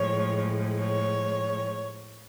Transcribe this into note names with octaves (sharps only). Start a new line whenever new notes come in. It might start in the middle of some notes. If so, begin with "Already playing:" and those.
Already playing: A2 F3 G#3 C#5
C#5